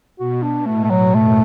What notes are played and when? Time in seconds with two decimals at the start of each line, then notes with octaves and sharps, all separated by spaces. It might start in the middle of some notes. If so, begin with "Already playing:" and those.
0.19 B2 F#4
0.43 D4
0.66 A2 A3
0.84 A3
0.90 F#3
1.14 F#2 A3